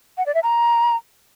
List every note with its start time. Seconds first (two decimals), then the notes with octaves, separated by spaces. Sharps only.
0.18 F#5
0.26 D5
0.35 E5
0.43 A#5